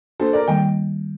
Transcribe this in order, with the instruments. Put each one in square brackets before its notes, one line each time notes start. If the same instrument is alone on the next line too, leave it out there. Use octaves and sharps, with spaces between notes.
[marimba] A#3 D4 F#4 [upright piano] A4 C5
[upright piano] A#4 D5
[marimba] D#3 G3 A#3 [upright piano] D#5 G5